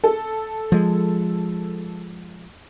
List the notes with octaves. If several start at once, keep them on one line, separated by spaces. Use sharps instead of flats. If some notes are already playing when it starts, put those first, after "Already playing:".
A4
F3 G#3